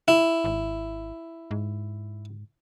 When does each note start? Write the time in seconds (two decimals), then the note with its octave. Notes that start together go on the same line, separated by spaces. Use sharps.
0.08 E4
0.44 G#1
1.51 G#2